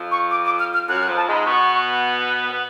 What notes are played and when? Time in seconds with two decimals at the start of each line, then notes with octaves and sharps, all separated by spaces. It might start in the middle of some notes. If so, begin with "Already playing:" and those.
Already playing: F2 F3
0.11 C#6
0.31 D6
0.45 D6
0.59 F6
0.74 F6
0.88 F#2 F#3 F#6
0.96 F6
1.03 F#6
1.07 F2 F3
1.17 A5
1.27 G#2 G#3
1.32 B5
1.45 B2 B3 C#6
2.50 B3